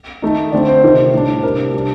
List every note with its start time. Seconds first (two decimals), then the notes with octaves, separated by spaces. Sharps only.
0.22 D#3 A3 D#4
0.52 D3 A3 C4 D5
0.68 C5
0.84 C3 D#3 A3
1.13 A2 G3 D4
1.37 C5
1.43 C3 G3 D4 A#4
1.73 C3 G3 D4